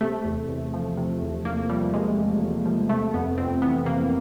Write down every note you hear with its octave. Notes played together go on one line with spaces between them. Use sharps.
C3 A3
E2
E2
F3
C3
E2
E2 A#3
F3 G3
C3 G#3
E2
E2
F3
C3 A3
F2 B3
F2 C4
E3 B3
C3 A#3